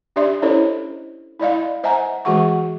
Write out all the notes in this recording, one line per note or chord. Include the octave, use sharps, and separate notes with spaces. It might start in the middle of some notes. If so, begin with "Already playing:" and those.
D4 G4 D5 E5 C6
C#4 E4 A4 C5 C#5 D#5
E4 D5 D#5 F5
C5 D#5 E5 F#5 G#5 A#5
E3 G#3 F#4 G#4 F#5 C#6